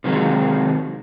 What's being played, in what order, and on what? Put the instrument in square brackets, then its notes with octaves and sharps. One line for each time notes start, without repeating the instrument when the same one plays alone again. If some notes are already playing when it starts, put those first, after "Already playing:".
[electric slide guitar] C3 D#3 F#3 G#3